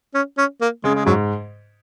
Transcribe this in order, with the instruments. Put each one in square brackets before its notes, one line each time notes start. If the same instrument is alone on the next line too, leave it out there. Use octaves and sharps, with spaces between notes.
[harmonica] C#4
C#4
A#3
[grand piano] C#3 [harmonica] G#3
[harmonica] G#3
[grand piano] G#2 [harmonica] F#3